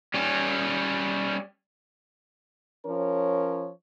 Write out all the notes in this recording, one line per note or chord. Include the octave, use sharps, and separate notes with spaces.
G3 C#4
F3 C#4 A#4 C#5